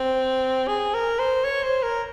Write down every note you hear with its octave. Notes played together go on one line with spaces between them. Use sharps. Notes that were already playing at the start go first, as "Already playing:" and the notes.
Already playing: C4
G#4
A#4
C5
C#5
C5
A#4